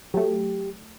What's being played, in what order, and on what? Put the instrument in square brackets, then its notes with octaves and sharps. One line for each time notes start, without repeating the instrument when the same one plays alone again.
[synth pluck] F#3 A3 [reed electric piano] G4